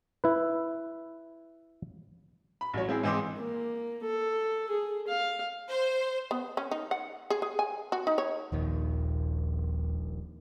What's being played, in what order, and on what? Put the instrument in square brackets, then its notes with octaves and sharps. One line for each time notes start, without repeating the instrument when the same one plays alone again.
[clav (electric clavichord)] E4 B4
[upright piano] B5
A1 F#3 C#5
G#3 C4 E4 G#4
G#2 E3 C4 D#5 C6 D6
[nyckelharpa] A#3
A4
G#4
F5
[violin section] C5
[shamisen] B3
C#4
D#4
F#5
G#4
G#4
G#5
F#4
D#4
C#5
[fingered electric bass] D#1 A#1 D#3 [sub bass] D#2